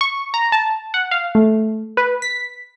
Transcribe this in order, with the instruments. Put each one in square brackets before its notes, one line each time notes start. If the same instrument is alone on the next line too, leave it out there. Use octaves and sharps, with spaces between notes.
[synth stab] C#6
A#5
A5
F#5
F5
A3
B4
B6